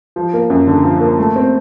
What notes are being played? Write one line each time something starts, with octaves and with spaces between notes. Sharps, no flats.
F3
A#3
F#2
D3
F3
A#3
A3
C4